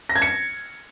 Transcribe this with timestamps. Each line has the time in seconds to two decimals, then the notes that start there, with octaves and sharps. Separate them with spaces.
0.09 A#6
0.16 G#6
0.22 C#7